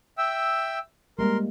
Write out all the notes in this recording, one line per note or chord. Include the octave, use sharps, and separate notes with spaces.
E5 G5 E6
G3 G#3 A#3 A#4 C6